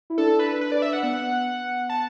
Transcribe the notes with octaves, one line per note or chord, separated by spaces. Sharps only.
E4
D4 A4
B4
B4
D5
E5
F#5
B3 F#5
A5